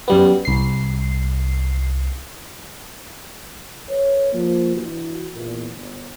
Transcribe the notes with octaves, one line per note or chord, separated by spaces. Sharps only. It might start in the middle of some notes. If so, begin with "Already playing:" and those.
F#2 G3 B3
C2 C7
A4 B4 C#5
F3 A#3
E3 D4 E4 F#4
E2 A#2
G1